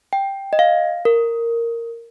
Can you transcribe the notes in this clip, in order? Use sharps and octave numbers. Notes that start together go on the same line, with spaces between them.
G5
D#5
F5
A#4